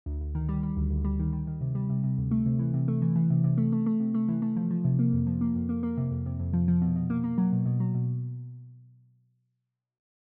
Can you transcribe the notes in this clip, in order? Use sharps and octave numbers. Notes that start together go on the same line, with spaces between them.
D2
D2
D#3
G3
G3
D2
D2
G3
D#3
G3
D#3
C3
G3
C3
C3
D2
A3
C3
E3
C3
A3
E3
E3
C3
C3
A3
A3
A3
C3
A3
E3
A3
F3
F3
C3
A#3
F2
F3
A#3
F2
A#3
A#3
C3
F2
C3
F2
F3
F3
B2
B2
A#3
A#3
F#3
B2
B2
F#3
B2